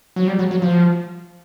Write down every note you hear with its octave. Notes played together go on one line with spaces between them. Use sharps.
F#3
G3
F#3
F#3
F3